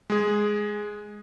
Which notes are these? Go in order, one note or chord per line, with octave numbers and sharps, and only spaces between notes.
G#3 G#4